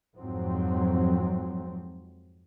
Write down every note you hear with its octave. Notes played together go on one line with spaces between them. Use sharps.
F2 G#2 F3 F#3 C4